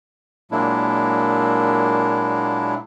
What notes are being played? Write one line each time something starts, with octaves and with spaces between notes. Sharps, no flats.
A#2 F#3 G#3 A#3 D4 E4